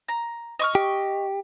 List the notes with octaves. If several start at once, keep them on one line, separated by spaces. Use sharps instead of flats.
A#5
D#5 C#6 F6
G4